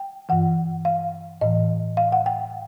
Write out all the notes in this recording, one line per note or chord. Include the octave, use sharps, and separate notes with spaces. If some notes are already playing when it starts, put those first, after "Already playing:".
Already playing: G5
G2 E3 F#5
F5
A2 E3 D#5
F5
F#5
G5